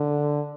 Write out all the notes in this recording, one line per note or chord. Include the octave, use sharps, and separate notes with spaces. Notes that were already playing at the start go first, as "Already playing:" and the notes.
Already playing: D3